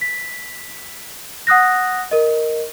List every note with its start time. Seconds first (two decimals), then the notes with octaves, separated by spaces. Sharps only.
0.01 B6
1.47 F#5 D#6 F#6 A#6
2.11 A#4 D#5